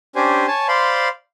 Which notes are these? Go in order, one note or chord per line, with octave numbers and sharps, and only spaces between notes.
C#4 D4 G4 C5 G#5
C#5 G#5 A5
C5 D5 F5 B5 C6